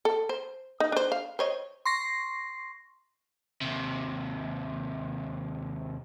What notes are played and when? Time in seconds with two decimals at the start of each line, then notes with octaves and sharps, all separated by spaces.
0.05 A4
0.29 C5
0.80 D#4
0.92 D4 C5
1.12 F5
1.39 C5 C#5 D#5
1.85 C6 C#6 A#6 C7
3.61 D#2 C3